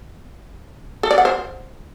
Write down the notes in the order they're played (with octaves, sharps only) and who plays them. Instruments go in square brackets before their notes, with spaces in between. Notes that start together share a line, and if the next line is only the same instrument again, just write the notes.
[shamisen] A4
D5
F#5
C5